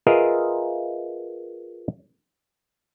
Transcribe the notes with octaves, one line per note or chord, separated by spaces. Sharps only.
F4 G#4 A#4 B4 D#5 E5